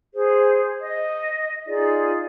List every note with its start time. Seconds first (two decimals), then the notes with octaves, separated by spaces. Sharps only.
0.14 G#4 C5
0.80 D#5
1.67 D#4 F4 G#4 D5